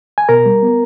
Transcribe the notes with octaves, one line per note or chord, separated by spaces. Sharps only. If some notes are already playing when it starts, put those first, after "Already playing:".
G#5
B2 A#4 A#5
G3
B3